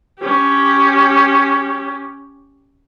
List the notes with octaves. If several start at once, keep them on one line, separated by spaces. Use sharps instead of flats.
C#4 G4